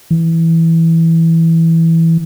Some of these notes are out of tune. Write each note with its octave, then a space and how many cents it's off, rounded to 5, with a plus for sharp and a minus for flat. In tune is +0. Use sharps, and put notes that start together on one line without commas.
E3 -5